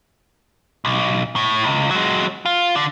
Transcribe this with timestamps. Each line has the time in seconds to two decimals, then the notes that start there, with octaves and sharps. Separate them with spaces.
0.85 B1
1.36 A2
1.64 C#2
1.91 F#3 G#3
2.45 F4
2.76 D3